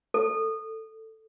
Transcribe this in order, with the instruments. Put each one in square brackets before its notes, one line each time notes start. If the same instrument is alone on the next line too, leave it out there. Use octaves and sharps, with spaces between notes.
[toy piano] A4